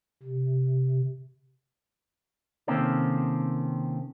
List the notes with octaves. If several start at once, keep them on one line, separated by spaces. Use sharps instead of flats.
C3
C3 D#3 A#3 C4 C#4 A4